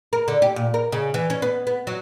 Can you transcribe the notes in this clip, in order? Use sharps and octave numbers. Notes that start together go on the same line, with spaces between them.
A#4
D3
G4
A#2
A#4
C#3
E3
C#4
B3
B3
F#3